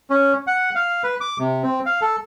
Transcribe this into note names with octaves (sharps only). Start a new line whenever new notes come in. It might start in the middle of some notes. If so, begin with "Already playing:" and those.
C#4
F#5
F5
B4
D6
C3
C4
F5
A4